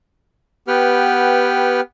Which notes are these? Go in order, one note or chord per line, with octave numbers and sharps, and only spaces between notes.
B3 G4 B4 F#5 G5 F6